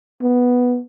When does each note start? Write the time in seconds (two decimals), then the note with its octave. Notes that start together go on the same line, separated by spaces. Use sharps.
0.22 B3